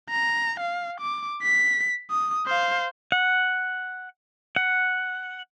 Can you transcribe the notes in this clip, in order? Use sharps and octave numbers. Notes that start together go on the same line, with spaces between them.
A#5
F5
D6
B6
D#6
C5 F5
F#5
F#5